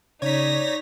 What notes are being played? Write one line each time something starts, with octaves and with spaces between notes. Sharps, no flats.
C#3 D#4 C#5 D5 A#6 B6